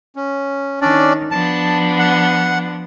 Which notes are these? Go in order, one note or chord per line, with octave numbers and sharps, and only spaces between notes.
C#4
D#3 C#4 D4 D5
F3 B3 D4 A5
F#5